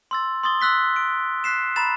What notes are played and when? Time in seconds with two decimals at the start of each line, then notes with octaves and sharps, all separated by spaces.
0.11 C6 E6 A6
0.43 C6 D#6 A6 G7
0.61 C6 E6 F#6 B6 G7
0.96 D7
1.44 F#6 B6 C7 E7
1.76 A#5 B5 A6 E7